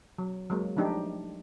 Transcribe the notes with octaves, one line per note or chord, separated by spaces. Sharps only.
F#3
F#3 G#3 A#3
F3 A3 D4 D#4 G4